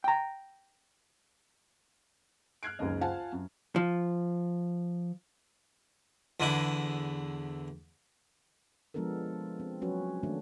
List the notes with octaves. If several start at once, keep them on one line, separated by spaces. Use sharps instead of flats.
G5 A#5
F6 F#6 G#6 C7 D7
F#1 C#2 F#2 D#3 D#5
F4 C5 F5 F#5 G#5 A5
F#2
F3
E2 D3 E4
F3 G#3 B3 D4 A4 A#4
C4
F3 F#3 C#4 F#4 B4
D#3 A3 A#3 D4 F#4